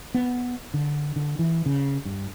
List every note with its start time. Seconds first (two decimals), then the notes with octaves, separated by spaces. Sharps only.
0.15 B3
0.74 D3
1.16 D3
1.39 E3
1.66 C#3
2.05 G2